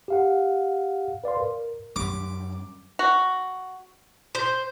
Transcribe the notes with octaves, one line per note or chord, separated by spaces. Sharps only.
G4 F5 F#5
B4 D5 F5 C6
A#4
F#2 G3 D6
F#4
C5